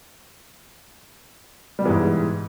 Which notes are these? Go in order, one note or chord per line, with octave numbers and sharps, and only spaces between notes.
G#2 B2 E3 G3